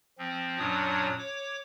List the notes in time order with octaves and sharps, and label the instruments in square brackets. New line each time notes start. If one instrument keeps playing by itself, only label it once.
[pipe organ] F3 C4
F#2 A#2 F#3 D4 C#5 D#6
C#5 D6